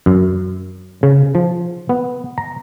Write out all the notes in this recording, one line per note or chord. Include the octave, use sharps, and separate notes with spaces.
F#2
C#3
F3
B3
A#5